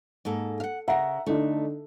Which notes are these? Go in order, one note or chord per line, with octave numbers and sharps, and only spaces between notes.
G#2 A#3 A4
F5 F#5
C#3 A#4 E5 F#5 A#5
D3 A3 D4 D#4